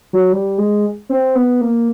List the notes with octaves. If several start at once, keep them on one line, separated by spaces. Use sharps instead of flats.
F#3
G3
G#3
C4
B3
A#3